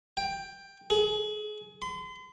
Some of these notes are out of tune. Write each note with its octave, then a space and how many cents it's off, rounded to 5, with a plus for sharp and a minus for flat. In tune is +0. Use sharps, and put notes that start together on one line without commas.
G5 +10
G#4 +30
C6 -40